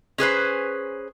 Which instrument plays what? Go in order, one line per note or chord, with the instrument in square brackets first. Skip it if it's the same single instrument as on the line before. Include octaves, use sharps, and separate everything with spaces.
[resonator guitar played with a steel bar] C#4 G#4 B4 C5